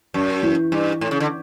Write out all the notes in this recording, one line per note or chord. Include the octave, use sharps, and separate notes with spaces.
F#2
E3
G2
A2
C#3
D3